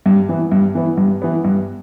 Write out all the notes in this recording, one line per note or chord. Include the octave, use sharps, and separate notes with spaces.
G2
E3 B3
G2
E3 B3
G2
E3 B3
G2